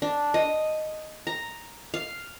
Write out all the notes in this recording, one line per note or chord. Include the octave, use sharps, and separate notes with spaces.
D4
D#5
A#5
F5